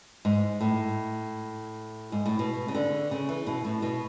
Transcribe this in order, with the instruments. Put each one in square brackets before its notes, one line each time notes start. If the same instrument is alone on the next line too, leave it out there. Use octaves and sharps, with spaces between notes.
[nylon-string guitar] G#2
A2
G#2
A2
B2
C#3
D3
C#3
E3
B2
A2
B2